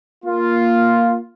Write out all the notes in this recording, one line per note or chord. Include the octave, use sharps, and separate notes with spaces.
A#3 F4